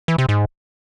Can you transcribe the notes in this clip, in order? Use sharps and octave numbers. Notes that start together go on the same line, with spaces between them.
E3
C3
G#2